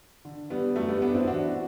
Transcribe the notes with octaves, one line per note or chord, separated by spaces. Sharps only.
D3
D3 G3 B3
F#2 F#3 A3
G3 B3
F#2 B3 D4
C4 E4
E3 D4 F#4